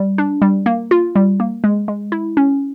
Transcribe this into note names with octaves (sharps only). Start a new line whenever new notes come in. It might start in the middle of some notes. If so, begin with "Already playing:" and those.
Already playing: G3
D4
G3
A#3
F4
G3
A#3
G#3
G#3
E4
C#4